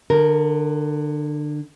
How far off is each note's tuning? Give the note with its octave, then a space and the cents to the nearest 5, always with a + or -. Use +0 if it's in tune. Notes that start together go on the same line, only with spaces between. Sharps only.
D3 +25 A#4 +0